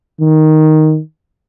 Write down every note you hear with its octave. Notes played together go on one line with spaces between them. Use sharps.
D#3